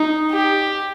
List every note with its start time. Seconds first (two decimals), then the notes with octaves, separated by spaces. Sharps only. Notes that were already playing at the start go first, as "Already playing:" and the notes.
Already playing: D#4
0.31 G4